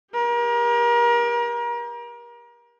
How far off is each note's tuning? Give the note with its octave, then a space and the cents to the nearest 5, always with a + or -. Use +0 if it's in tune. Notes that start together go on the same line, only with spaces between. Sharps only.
G4 +40 A#4 +35